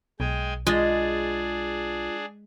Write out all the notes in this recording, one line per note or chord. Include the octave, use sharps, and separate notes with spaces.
B1 G#3 G5 G#5
G#3 D4 F4 G#4 A6